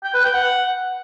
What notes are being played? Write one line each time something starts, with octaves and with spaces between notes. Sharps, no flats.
G5
B4
G5
F#5